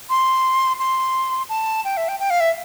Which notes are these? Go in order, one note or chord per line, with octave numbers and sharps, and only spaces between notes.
C6
C6
A5
G5
E5
G5
G5
F5
E5